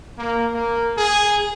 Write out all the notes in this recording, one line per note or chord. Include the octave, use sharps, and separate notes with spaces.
A#3
A#3
G#4